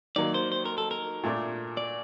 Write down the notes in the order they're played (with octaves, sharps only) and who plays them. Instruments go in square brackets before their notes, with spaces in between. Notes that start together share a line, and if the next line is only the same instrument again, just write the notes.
[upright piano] D#3 F#3 A#3 [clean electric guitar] D5
[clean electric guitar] C5
C5
A#4
A4
A#4
[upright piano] A#2 A3 D4
[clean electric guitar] D5